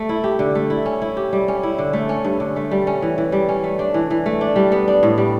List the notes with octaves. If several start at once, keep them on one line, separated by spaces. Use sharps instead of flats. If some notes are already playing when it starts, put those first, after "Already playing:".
Already playing: A3
E4
G4
D3
A3
E4
C#4
E4
G4
G3
C#4
E4
D3
A3
C#4
G2
D3
A3
G3
C#4
E3
E3
G3
C#4
A3
D4
E3
E3
A3
D4
G3
B3
D4
A2
G3